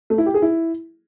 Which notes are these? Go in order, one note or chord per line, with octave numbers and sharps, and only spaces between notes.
A3
E4
G4
G#4
E4